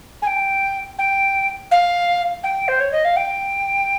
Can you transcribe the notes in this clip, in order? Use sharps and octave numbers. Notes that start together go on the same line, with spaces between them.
G#5
G5
G5
F5
G5
C5
C#5
D#5
F5
G5